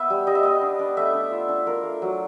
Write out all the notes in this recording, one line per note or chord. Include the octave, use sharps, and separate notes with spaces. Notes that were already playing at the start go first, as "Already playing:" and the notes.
Already playing: B3 E5
G3
G3 D#5
E5
B3 D#5
D4
D4
A3 E5
D4
F4
D4
F4 A#4
A3
F#3